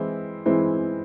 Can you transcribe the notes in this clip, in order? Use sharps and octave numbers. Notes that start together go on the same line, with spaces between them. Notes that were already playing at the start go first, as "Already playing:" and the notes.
Already playing: E3 G#3 C4 E4
E3 G#3 C4 E4